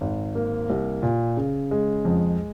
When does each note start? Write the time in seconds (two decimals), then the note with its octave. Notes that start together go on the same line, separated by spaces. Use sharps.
0.01 G#1
0.35 A#3
0.70 C2
1.03 A#2
1.37 C#3
1.71 G#3
2.05 F2